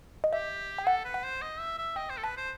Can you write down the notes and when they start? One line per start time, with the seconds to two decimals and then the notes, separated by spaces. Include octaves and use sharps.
0.24 D#5
0.33 G4 E5
0.78 G5
0.87 A4 F#5
1.05 B4
1.14 F#5
1.24 C5
1.42 D#5
1.60 E5
1.78 E5
1.96 D#5 G5
2.10 C5
2.17 A4
2.24 B4 A5
2.37 C5